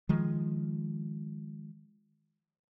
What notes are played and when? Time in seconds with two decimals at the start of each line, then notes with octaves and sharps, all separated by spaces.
0.09 D#3 F3 G#3